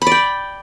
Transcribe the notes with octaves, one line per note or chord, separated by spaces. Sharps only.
B5
D5
G5